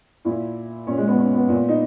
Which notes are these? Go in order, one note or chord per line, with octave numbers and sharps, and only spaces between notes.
A#2 E4
A#2 C#4
G#3
B3
C#4
B3
A#2
D#4